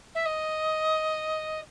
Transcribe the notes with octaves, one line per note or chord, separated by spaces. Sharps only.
E5
D#5